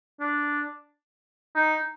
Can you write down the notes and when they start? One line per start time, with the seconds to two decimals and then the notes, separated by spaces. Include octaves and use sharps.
0.20 D4
1.55 D#4